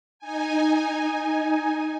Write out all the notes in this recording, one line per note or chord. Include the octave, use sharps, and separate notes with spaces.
D#4 G#5